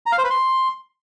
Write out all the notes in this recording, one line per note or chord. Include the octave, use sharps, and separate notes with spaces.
A#5
F5
C5
B4
C6